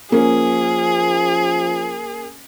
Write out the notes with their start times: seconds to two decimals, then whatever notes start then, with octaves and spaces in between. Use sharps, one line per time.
0.12 F3 A#3 C#4 G#4